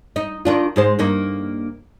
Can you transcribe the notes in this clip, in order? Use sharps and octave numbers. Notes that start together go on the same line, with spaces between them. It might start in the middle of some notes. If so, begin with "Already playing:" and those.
D#4
D#3 D4 F4
G#2 G#3 C5
G2 A#3 D#4